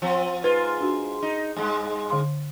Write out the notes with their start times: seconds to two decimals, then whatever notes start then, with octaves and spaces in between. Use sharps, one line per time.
0.02 F3 C4
0.44 G#2 F4 B4
0.81 D4 F#4
1.22 D#4
1.56 G2 G#3
2.10 D3 F5 C6